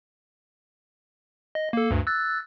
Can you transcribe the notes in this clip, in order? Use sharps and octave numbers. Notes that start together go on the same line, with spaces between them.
D#5
A#3 A4
D2 G2
E6 F#6 A6